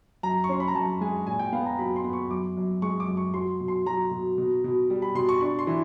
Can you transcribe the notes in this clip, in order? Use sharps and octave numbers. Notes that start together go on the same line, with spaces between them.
F#2 A#5
C#6
C#4 C6
B5
A#5
F#2 A5
G#3 G#5
A#2 G#5
G5
B3 F5
A#5
F#3 B5
C6
B3
C#6
F#2 D6
F#2
G#3 C#6
D6
F#2
C#6
F#3 C6
B2
C6
F#3 A#5
B2
B2
B2
G3
B5
B2 C6
C#6
D4 C#6
C6
E3